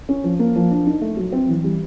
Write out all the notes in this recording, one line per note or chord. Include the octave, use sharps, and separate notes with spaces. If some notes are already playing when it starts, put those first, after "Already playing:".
C#4
F3
A#3
F3
D4
D#4
A3
F#3
C4
E3
G3